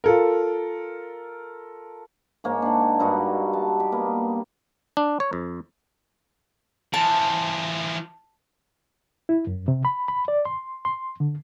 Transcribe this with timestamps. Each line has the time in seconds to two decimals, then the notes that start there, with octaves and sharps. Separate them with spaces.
0.04 F4 A4 A#4
2.44 G#2 A#3 C#5
2.62 D4 F#5
3.00 G2 G3 D#4 F#4
3.53 A5
3.80 G4
3.92 A#3 B3
4.97 D4
5.20 C#5
5.33 F2
6.94 E3 F3 A5
9.29 E4
9.47 F#2
9.68 C3
9.85 B5
10.08 B5
10.28 D5
10.45 C6
10.85 C6
11.20 D3